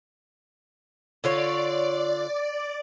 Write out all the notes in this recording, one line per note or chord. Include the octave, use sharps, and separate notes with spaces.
D3 F4 C#5 D5